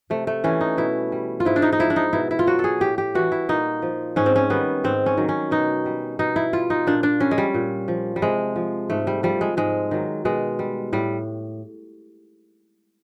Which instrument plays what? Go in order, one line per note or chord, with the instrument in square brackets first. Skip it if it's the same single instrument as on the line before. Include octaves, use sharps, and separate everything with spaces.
[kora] C3 A3
A3
E3 G3 C#4
D#4
B2 E4
G3
F4
G#2 E4
D4
D#4
D#4
F3 E4
D4
D#4
B2 E4
E4
F4
F#3 F#4
A4
G#4
A2 G4
G4
E3 G3 F#4
E4
A#2 D#4
F3
G#2 C#4
C4
C#4
D#3 G3 B3
G#2 C4
C#4
D#3 F#3
C#4
B2 D#4
G3
B2 D#4
E4
G3 F4
D#4
A#2 D4
D4
G3 C#4
G#3
G3
A#2
F3
G3
C3 G#3
F3
G#2 A3
G3
F3 G3
G#3
G#2 G#3
D#3 F#3
B2 G#3
G3
A2 G3